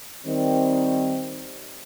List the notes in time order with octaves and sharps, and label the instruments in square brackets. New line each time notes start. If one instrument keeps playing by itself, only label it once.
[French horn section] D#3 G3 C4